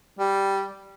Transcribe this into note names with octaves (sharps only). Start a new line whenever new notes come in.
G3